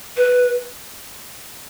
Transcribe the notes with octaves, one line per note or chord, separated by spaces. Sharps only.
B4